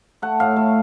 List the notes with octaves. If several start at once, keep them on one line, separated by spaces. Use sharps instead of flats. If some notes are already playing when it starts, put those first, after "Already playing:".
A3 F#5
A2 F5
A3